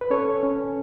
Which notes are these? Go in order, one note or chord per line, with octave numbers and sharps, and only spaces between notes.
B4
C#4 A4 C#5
C#4